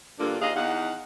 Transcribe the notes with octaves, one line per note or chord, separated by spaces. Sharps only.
G2 D3 A#3 D4 F4
D#2 G#4 D#5 F5
E2 D#4 F5 F#5